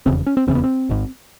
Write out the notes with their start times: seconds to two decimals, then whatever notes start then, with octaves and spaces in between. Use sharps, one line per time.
0.06 F1 E2 C#3 C4
0.26 C#4
0.37 C4
0.47 F1 E2 C#3 C4
0.55 B3
0.64 C4
0.89 G#1 G#2